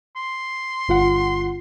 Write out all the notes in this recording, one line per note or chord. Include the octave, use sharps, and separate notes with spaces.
C6
G1 F4 F#5